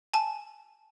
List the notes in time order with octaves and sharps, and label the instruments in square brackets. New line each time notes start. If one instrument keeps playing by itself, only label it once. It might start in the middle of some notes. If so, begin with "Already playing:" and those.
[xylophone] G#5 A5